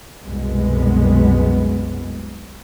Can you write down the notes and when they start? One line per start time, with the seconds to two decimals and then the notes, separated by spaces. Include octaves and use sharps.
0.24 C2 F#2 B2 G#3 B3